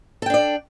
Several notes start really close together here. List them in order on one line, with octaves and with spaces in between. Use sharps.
A4 G5 D4 D5